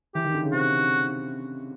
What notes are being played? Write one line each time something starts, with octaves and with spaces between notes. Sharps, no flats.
E3 G4
D#3
D3
C#3
C3 F#4